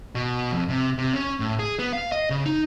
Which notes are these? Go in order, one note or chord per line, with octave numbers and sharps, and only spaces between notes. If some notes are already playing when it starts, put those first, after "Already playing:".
B2
F2
C3
C3
C#4
A2
G#4
B3
F5
D#5
C#3
D#4